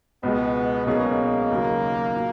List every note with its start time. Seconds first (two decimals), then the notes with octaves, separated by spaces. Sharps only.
0.23 C#2 B2 G#3 B3
0.86 B1 B2 G#3 A#3 C#4 G#4
1.50 D#2 C#3 F#3
2.15 A#2